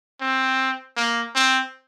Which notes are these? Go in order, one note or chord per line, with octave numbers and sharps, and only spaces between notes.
C4
A#3
C4